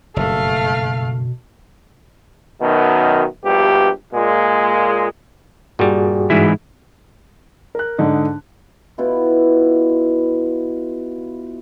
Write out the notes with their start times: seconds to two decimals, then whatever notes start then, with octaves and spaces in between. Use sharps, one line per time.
0.16 F#1 G2 B2 A3 F5
2.61 F#2 B2 D#3
3.44 A#1 G2 B2 G4
4.12 A#2 G#3
5.79 G2 A#2 G3 F#4 G#4
6.30 G#2 E3 E4
7.75 A#4 F#6
7.98 G#2 D3 D#4
8.98 B2 E4 F4 B4